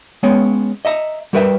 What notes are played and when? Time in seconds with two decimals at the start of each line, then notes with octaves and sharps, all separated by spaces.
0.23 G#3 B3 C#4 C#5 G5
0.85 D#5 E5 A#5
1.33 G3 F#4 A#4 B4 E5 G5